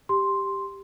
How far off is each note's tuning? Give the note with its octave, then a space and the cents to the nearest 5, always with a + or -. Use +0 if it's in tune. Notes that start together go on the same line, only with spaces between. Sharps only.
G4 +0 C6 +0